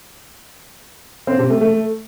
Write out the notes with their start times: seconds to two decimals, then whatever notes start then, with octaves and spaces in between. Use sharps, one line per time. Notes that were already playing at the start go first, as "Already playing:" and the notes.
1.27 C4
1.39 C3
1.50 A3
1.61 A3